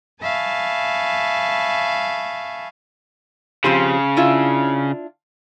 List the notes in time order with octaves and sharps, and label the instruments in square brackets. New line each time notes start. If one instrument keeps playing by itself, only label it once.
[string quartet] E5 F5 G#5 A5 B5 C#6
[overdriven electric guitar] C#3 [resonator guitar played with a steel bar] F3 C4 G4
[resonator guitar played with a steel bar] D4 E4 F4